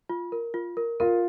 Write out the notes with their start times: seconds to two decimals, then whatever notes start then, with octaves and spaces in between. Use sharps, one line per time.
0.10 F4
0.32 A#4
0.54 F4
0.77 A#4
1.00 F4 A#4